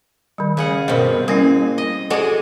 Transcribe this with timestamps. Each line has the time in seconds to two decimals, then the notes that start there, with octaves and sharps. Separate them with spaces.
0.38 D#3 G3
0.57 C#3 G#4 F#5
0.88 G2 B2 C4 A#4 D#5
1.28 G3 A#3 C#4 E4 G#4
1.78 D#5
2.10 G#3 F#4 G#4 A4 D5 D#5